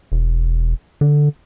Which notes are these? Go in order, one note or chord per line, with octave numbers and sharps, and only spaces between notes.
E1
D3